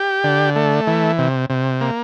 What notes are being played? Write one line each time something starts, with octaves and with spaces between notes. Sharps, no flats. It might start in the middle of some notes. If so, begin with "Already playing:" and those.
Already playing: G4
D3
A3
E3
C3
C3
A#3